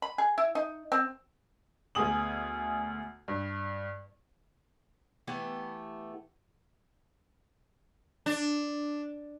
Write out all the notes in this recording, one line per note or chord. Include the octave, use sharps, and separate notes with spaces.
B5
G#4
E4
D#4
C4
D2 B3 G#4 G#5 D#6 F#7
G2
E3 A3 B3 G4
D4